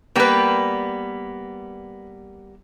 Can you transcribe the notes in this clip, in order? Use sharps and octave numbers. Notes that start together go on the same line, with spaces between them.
G3 A#3 B3 B4 G5